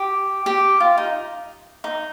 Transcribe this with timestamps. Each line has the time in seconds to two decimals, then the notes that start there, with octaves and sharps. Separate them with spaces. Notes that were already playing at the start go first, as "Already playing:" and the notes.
Already playing: G4
0.46 G4
0.80 F4
0.98 D#4
1.84 D#4